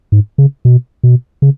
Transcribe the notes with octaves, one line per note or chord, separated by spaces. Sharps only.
G#2
C#3
B2
B2
C#3